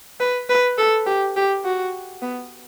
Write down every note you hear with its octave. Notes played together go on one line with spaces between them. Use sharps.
B4
B4
A4
G4
G4
F#4
B3